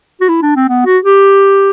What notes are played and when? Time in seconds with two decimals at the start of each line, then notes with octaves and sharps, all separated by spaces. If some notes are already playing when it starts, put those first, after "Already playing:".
0.21 F#4
0.29 E4
0.42 D4
0.56 C4
0.69 B3
0.86 F#4
1.03 G4